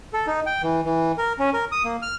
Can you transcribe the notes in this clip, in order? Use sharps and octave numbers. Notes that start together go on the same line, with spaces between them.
A4
D#4
G5
E3
E3
A#4
C#4
A#4
D#6
A#3
F6